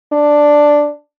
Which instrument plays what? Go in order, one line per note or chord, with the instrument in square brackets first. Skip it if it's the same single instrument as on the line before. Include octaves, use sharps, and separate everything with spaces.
[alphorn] D4